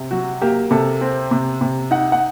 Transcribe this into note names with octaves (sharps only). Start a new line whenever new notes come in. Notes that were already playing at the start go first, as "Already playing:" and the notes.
Already playing: C3
F#3 F#4
A#3 G4
C3 A4
C4
C3
C3
D#4 F#5
F#5